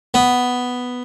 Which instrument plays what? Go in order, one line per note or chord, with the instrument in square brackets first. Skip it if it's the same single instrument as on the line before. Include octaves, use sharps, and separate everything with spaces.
[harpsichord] B3